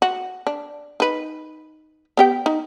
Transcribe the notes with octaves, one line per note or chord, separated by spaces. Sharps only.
F#4
D4
D#4 B4
B3 G4 G5
D#4